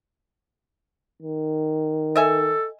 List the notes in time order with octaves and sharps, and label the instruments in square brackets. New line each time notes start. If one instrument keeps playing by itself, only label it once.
[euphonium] D#3
[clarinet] A4 [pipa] D#5 E5 G#5